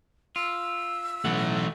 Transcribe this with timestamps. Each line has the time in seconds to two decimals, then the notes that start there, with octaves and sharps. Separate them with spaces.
0.36 F4 E6
1.25 B1 E3 A3 F#5